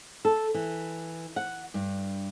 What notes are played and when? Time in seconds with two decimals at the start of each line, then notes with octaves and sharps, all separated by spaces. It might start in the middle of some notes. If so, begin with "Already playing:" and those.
0.25 A4
0.54 E3
1.36 F#5
1.74 G2